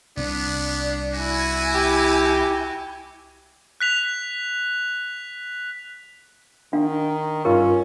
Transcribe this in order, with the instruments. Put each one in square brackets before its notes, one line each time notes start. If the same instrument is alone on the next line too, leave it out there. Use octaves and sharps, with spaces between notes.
[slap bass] C2 C4 [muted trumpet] B3 [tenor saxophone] D4
[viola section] E4 G#5 [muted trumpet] F#4
[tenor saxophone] G4
[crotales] F#6 B6 F7
[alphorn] D#3 [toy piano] D4 F5
[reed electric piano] G2 F4 C#6 [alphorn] C#4 [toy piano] A#4